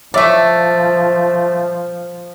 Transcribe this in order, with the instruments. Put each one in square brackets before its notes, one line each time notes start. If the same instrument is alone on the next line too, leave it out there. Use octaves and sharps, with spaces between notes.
[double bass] F3 [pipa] A3 D5 [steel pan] C#5 E5